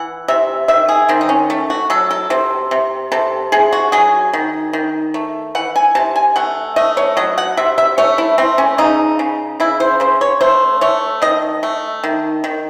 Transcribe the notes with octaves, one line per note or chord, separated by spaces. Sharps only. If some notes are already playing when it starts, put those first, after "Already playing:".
Already playing: E3 F#5
C3 E5
D#3 E5
G#4
D#3 C4
D#4
C#4
A3
F#4
F#3 A4
A4
C3 C5
C3
C3 A4
C3 G#4
F#4
F#3 G#4
D#3
D#3
A3
E3 F#5
G#5
C3 A5
G#5
A3 F#5
A3 D#5
C#5
F#3 D#5
F#5
C3 E5
E5
A3 C#5
E4
A3 C4
C#4
C#3 D#4
C#3
C#3 E4
C5
C#3 C5
C#5
A3 C5
A3 C#5
D#3 D#5
A3
D#3
D#3